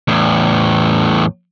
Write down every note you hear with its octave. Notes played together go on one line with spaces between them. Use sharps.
E2 A2